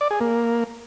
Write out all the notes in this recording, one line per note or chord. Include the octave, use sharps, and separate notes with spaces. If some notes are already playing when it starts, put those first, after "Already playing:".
D5
G#4
A#3